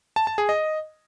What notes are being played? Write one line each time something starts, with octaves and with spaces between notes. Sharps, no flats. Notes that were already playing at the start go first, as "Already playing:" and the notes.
A5
A5
G#4
D#5